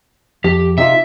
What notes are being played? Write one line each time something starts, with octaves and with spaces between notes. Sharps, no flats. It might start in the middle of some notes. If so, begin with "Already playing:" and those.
F2 G4
C3 D#4 F4 E5